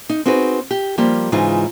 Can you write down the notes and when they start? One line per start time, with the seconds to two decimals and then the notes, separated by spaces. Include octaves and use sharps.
0.10 D#4
0.26 C4 D#4 F#4 G#4 B4
0.71 G4
0.98 F3 G3 A#3 G4
1.32 G#2 C#3 E3 G#3 D#4 F4